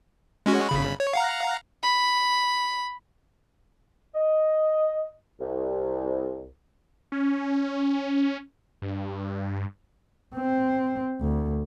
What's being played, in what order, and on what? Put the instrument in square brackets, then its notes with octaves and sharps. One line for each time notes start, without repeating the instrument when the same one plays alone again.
[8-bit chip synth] G#3 C#4 F#4
G1 C#3 B5
C#5
F5 F#5 A#5
[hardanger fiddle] B5
[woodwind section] D#5
C2
[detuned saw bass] C#4
G2
[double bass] C4
D2